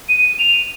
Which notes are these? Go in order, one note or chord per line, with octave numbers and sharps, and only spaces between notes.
D#7
D#7
D#7
F7